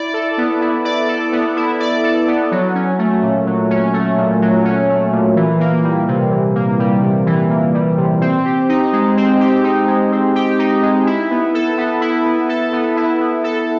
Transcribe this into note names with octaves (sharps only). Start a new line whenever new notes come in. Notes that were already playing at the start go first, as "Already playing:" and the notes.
Already playing: E4 D5
A4
B3
E4
D5
A4
B3
E4
D5
A4
B3
F#3
C#4
A3
A#2
F#3
C#4
A3
A#2
F#3
C#4
A3
A#2
E3
A#3
G3
C3
E3
A#3
G3
C3
E3
A#3
G3
C3
C4
G4
D#4
G#3
C4
G4
D#4
G#3
C4
G4
D#4
G#3
E4
B3
A4
B3
E4
B3
A4
B3
E4
B3
A4